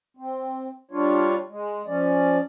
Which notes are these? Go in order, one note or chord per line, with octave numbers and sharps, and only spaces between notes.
C4
G3 D4 F4 C#5
G#3
F3 C#4 D5